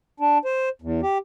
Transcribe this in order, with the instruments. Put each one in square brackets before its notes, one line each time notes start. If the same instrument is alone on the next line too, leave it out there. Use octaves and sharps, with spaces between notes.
[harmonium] D4
C5
E2
G4